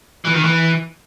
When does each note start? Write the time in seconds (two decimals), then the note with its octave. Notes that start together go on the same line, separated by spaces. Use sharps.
0.25 E3
0.34 D#3
0.44 E3